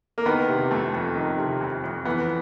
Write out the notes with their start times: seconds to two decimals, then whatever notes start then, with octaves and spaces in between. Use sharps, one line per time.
0.18 A#3
0.26 D#3 B3
0.49 C3
0.71 F2 A3
0.94 F2
1.16 D#3
1.38 C3
1.61 F2
1.83 F2
2.05 E3 B3